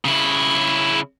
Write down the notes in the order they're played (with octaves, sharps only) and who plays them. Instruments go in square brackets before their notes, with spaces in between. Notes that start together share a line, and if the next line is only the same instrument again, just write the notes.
[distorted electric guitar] C#3 E4